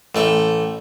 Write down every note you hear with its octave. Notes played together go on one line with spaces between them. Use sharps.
A1 A3 G5